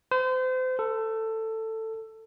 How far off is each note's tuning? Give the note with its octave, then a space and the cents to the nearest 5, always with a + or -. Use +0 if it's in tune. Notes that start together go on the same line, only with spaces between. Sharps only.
C5 -35
A4 +15